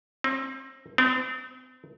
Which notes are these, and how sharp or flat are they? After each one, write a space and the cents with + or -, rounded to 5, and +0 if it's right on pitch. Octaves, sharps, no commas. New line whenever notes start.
C4 +30
C4 -40